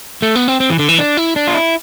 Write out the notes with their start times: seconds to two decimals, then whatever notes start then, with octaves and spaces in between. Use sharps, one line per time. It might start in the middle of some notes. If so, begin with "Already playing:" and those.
0.22 A3
0.35 B3
0.48 C4
0.60 C4
0.70 E3
0.79 D3
0.89 E3
0.99 D4
1.17 E4
1.36 D4
1.47 F4
1.54 E4